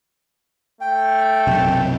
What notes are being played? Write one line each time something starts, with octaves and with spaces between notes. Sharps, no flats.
A3 G5
B1 F#2 C3